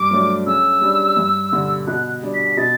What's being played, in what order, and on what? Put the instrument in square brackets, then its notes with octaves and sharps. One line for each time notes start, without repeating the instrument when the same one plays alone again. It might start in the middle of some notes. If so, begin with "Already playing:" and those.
Already playing: [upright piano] G2 [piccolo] D6
[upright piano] F#3 A3 D4
[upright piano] C#3 [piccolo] E6
[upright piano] G3 D4
G2
D3 G3
[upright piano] B2 [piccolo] F#6
[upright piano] G3 D4
[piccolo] B6
[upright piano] B2 [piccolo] A6